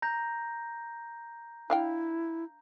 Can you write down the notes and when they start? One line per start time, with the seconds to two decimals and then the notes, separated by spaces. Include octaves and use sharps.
0.02 A#5 G6 A#6
1.70 D4 E4 F5 G5